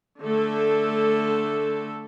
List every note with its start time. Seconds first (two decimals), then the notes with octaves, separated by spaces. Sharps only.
0.21 D3 A3 A4